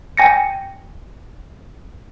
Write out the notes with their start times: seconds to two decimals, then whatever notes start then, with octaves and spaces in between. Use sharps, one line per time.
0.17 G5 G#5 A#6 C#7